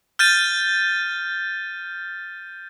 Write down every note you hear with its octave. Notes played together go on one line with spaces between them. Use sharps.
F6 G6 A6 D#7